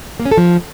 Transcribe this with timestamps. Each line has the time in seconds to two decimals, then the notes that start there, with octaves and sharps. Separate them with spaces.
0.20 A#3
0.26 C#4
0.31 A4
0.37 F3